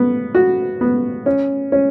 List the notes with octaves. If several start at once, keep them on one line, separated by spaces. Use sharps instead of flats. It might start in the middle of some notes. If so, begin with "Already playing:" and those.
Already playing: B3
F#4
B3
C#4
C#4